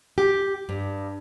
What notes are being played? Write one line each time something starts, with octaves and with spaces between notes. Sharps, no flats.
G4
G2